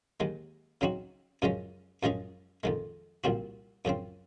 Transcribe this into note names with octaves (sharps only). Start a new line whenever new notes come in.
D#2 D#3 G#3
C#3 F#3 C4 D#4 F#4
F#2 C#3 F3 G#3 C#4
F#2 F3 G#3 C#4 G#4
F2 D#3 G#3
C2 A#2 F3 C4 F#4
F#2 C#3 F3 C4